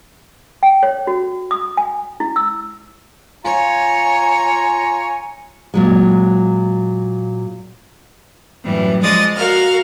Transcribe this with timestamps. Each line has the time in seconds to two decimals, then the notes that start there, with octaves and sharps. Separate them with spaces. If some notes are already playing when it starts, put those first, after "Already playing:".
0.63 G5
0.83 C#5
1.07 F#4
1.51 D#6
1.77 G#5
2.20 E4
2.36 E6
3.45 F4 C#5 G#5 A#5
5.74 A#2 F#3 G#3
8.64 F#2 A2 E3 G3
9.01 F3 G#3 D5 D#5 D#6 A6
9.35 F#4 A#4 F5 F6